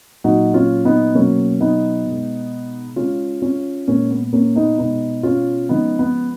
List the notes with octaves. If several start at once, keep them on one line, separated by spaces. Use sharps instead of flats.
A#2 F#3 D#4 F#4
C#4 F4
B3 D#4
B2 F#3 A#3 C#4
B3 D#4
B2 G#3
C#3 G#3 C#4 F4
C#4 F4
A#2 G#3 A#3 C#4
B3
A#3 C#4
B3 D#4
B2 G#3 B3 D#4
C#4 F4
C#3 F3 G#3 B3 D#4
B3